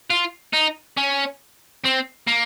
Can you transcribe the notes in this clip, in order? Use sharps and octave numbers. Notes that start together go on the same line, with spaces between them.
F4
D#4
C#4
C4
A#3